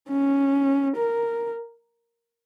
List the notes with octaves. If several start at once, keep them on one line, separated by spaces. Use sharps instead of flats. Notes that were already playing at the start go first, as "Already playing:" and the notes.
C#4
A#4